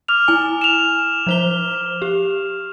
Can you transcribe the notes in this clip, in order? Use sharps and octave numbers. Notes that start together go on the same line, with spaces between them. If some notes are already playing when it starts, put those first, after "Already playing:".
D6 F6 F7
E4 G#5
E7 F7
F3 C5 G7
G4